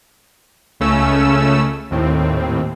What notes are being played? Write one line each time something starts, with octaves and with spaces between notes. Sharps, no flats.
C#2 C#3 A3 C#4 E6
D#2 A2 C4